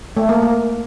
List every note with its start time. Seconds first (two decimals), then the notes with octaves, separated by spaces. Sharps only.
0.17 A3
0.29 A#3
0.42 A#3